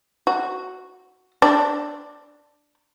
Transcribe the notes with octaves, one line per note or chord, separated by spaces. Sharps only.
F#4
D4